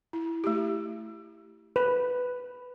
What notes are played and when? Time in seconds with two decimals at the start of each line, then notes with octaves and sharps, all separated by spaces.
0.13 E4
0.44 A3 E4 G4
1.76 B4